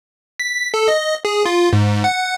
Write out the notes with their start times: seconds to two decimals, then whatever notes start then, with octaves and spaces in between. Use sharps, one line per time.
0.39 B6
0.74 A4
0.88 D#5
1.25 G#4
1.45 F4
1.73 G#2
2.04 F#5